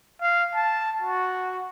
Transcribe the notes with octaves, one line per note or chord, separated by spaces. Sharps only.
F5
A5
F#4